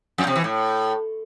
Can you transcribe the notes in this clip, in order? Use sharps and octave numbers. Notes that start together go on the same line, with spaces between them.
F2
C3
E3
A2